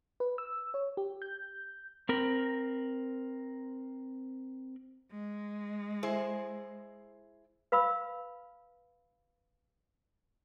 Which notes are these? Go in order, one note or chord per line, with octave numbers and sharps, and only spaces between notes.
B4
E6
C#5
G4
G6
C4 A#4 B5
G#3
E4 G#4 C5
B4 F5 B5 E6